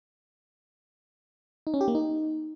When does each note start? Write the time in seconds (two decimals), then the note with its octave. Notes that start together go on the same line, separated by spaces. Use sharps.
1.67 D#4
1.74 C#4
1.81 G4
1.88 A#3
1.95 D#4